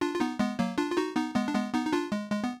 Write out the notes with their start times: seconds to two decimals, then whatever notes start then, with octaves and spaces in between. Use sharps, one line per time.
0.01 D4 F4
0.15 F4
0.20 B3 D#4
0.39 G#3 B3
0.59 F#3 A#3
0.78 D4 F4
0.91 F4
0.97 D#4 F#4
1.16 B3 D#4
1.35 G#3 B3
1.48 D4
1.54 G#3 B3
1.73 B3 D#4
1.85 D#4
1.92 D4 F4
2.12 G#3
2.32 G#3
2.44 B3